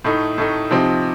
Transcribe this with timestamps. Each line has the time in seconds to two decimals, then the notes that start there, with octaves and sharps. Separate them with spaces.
0.05 A2 A3 D#4
0.38 A2 A3 D#4
0.71 C3 F3 C4 D#4